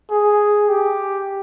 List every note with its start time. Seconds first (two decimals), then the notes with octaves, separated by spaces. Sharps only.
0.11 G#4
0.69 G4